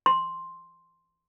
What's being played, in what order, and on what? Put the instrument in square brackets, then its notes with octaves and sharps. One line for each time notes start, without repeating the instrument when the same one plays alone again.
[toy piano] C6